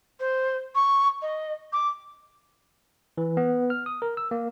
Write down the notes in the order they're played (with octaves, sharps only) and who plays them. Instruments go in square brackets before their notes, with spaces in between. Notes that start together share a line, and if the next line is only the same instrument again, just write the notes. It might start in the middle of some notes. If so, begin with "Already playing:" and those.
[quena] C5
C#6
D#5
D6
[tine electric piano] E3
B3
F6
D#6
A#4
E6
A#3